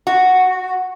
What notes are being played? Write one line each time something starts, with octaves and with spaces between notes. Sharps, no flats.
F#4